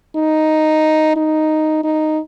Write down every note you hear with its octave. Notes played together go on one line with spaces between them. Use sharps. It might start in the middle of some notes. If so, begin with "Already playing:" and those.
D#4
D#4
D#4